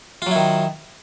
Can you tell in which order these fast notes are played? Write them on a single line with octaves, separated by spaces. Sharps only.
F4 F#3 E4 D#3